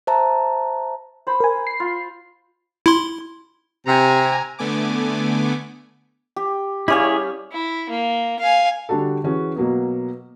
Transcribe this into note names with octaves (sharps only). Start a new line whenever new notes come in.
C5 E5 A5 A#5
C5 B5
A#4 G#5
C7
F4
E4 C6
C3 G#5 A#5
D3 A3 B3 G#5 D6
G4
G3 C#4 E4 G#4 C#5 F5
E4
A#3
F5 G#5
D3 G3 D4 F#4 A4
E3 C#4 F#4 G#4
B2 F#3 A#3 B3